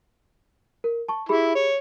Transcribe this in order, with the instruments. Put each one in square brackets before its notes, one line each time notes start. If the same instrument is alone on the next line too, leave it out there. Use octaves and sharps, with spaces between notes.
[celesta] A#4
A5 C#6
[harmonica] E4 [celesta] G4 G#4 B5
[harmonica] C#5